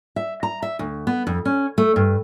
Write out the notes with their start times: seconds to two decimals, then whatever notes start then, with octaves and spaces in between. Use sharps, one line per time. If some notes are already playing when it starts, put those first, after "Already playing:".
0.16 E5
0.43 A#5
0.62 E5
0.79 D2
1.07 B3
1.27 F2
1.45 C#4
1.78 A3
1.96 G2